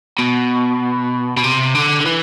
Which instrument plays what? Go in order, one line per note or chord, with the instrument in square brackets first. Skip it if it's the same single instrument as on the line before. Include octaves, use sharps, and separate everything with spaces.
[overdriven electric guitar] B2
B2
C3
D3
D3
E3